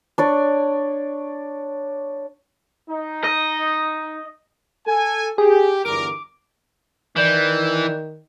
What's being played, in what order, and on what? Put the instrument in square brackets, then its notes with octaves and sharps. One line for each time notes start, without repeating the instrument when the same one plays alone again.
[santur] D4 C#5 D5
[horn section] D#4
[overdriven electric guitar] D#5
[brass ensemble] A4 G#5
[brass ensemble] G4 [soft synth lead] G#4
[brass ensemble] G1 E2 A#4 [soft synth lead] D6
[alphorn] D#3 [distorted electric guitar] E3 [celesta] D5 G6 E7